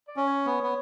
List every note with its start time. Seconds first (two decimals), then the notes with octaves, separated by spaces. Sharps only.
0.08 D5
0.17 C#4
0.27 C#5
0.46 B3
0.63 B3